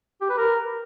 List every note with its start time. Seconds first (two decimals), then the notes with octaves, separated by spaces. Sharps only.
0.21 G4
0.29 B4
0.38 A#4